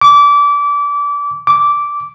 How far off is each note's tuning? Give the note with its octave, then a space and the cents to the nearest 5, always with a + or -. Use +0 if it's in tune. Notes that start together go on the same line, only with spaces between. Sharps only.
D6 -25
D6 -10